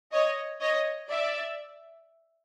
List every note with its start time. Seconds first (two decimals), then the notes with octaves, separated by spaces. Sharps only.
0.12 C#5 D#5
0.61 C#5 D#5
1.10 D5 E5